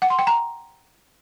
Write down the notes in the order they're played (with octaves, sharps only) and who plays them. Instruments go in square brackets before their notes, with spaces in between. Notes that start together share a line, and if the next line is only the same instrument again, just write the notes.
[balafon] F#5
C6
G5
A#5